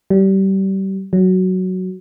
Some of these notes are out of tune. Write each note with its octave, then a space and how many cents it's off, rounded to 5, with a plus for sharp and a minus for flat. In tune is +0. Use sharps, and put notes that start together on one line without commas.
G3 -25
F#3 +5